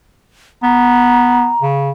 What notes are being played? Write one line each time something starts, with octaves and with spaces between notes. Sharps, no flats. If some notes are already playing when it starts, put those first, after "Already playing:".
B3 A#5
C#3